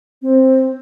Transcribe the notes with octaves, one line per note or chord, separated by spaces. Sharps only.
C4